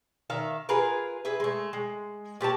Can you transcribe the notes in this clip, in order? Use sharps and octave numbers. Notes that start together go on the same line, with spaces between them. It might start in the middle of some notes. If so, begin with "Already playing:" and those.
D#3 E5 F5
F4 G#4 A#4 B4
G#4 B4 E5
G#3 A3
G#3
A#2 G4 C#5 A5